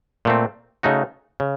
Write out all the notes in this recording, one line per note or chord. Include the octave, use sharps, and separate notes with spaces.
A#2 A3 C4
C#3 A3 D#4 F#4
C#3